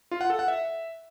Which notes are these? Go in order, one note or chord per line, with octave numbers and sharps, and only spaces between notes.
F4
F#5
A4
F#5
E5